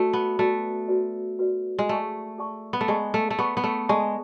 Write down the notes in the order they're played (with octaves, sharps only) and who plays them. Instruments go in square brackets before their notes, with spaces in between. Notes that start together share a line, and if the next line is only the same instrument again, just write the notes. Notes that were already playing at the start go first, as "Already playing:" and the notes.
Already playing: [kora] A3 [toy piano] F#4 B4 D5
[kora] B3
[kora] A3 [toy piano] F#4 B4 D5
[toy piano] F#4 B4 D5
F#4 B4 D5
[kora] G#3
[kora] A3 [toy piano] G#4 D5 A5 C#6
[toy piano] G#4 D5 A5 C#6
[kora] B3
A3
[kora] G#3 [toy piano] G#4 D5 A5 C#6
[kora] A3
A3
[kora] B3 [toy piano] G#4 D5 A5 C#6
[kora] B3
A3
[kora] G#3 [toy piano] A4 D5 A5 C#6